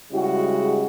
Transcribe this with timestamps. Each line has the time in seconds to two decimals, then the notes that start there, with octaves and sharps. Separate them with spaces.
0.12 C#3 G3 G#3 E4 F#4